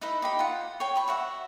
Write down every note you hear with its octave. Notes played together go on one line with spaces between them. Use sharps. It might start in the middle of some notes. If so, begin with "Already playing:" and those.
D#4 E4 B4 E5
D#4 G4 B5
F4 F#5
C#5 G5
B5 C#6
F#4 E5 F#5